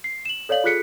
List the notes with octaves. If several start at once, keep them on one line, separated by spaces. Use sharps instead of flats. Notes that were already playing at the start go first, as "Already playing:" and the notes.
C7
E7 F#7
A4 C#5 D5 F5 F#7
F4 G#4 A4 F#6 B6 C#7